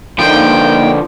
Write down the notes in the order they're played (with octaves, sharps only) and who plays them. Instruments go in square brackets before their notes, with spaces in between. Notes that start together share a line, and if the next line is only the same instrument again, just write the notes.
[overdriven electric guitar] D3 F3 [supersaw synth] A#3 D#4 [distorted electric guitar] G5